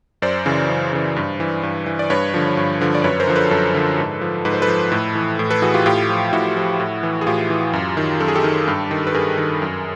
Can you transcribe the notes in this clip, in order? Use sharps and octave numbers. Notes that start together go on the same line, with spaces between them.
F#2 C5 D5
C#3 E3
F#2
C#3 E3
G2
E3
G2
E3
D5
G2 B4 C#5
D3 F3
G2
D3 F3
D5
F#2 B4 C#5
A#4 C5
D3 F3
A4 B4
F#2 A4 B4
D3 F3
G#2
F3
G#2 B4
C5
A4 B4
F3
A2
E3
A2
A4 B4
E3 F#4 G#4
F4 G4
A2 F4 G4
F3
A2 E4 F#4
F3
A2
E3
G#4
A2 F4 G4
E3
F#2
D#3
F#2 A4
G#4
G4 A4
D#3
G2
D#3
B4
G2 G#4 A#4
D#3
F#2